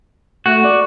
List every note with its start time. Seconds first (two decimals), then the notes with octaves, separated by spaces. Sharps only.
0.46 A3 F#4
0.64 D5